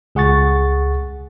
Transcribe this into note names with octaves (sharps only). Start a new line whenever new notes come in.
C#2 G#4 F#5 C#6 A6